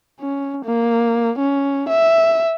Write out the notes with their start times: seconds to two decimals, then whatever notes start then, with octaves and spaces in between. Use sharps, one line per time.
0.20 C#4
0.65 A#3
1.39 C#4
1.89 E5